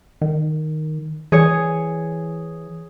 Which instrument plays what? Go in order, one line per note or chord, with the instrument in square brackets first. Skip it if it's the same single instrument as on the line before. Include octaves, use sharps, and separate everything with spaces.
[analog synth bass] D#3
[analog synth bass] E3 [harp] G#4 C#5